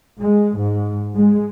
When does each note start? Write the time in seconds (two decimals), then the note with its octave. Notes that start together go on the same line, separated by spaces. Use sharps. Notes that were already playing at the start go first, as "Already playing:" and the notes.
0.20 G#3
0.57 G#2
1.15 G#3